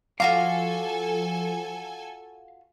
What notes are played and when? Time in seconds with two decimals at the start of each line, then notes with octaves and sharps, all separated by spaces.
0.20 F3 F4 F#4 A4 F5 G#5 D6